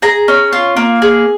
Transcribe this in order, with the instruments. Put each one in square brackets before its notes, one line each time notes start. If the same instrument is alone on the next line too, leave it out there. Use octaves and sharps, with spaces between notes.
[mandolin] G#4 A#5
C#4
F4
A#3
G#4